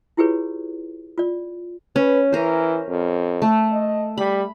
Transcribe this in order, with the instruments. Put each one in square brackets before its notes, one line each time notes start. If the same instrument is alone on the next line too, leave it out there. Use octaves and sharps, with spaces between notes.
[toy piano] E4 F4 G4 G#4 B4 C#5
F4 D5
[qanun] C#4 [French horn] B4
[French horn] E3 [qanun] C#4 A#4 C5
[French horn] F2
[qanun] A3
[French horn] D#5
[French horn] G3 [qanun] B5